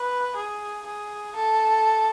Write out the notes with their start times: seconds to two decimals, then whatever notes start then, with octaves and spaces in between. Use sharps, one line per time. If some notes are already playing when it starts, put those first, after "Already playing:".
Already playing: B4
0.36 G#4
0.86 G#4
1.36 A4